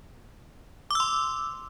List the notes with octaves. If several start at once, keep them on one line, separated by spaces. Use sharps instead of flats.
C6 D6 E6